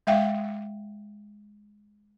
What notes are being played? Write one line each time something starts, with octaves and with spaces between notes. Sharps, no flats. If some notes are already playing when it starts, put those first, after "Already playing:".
G#3 E5 F5 G5